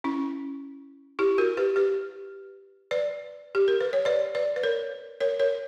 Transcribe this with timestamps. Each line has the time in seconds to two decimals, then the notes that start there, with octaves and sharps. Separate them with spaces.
0.04 C#4 E4
1.19 E4 G4
1.38 F#4 A#4
1.57 G4 B4
1.76 G4 B4
2.91 B4 D5
3.55 G4
3.68 A#4
3.81 B4
3.93 C#5
4.05 B4 D5
4.35 B4 D5
4.56 B4
4.63 A#4 C#5
5.20 A#4 C#5
5.40 A#4 C#5